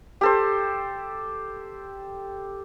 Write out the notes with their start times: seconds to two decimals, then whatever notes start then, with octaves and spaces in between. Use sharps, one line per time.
0.21 G4 A4 C5